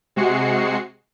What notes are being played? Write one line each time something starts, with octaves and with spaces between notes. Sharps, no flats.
C3 G#3 F#4 C7 C#7